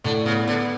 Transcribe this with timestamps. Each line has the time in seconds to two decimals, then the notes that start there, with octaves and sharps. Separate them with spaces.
0.04 A2 D3
0.25 C#3 B3
0.47 D3 B3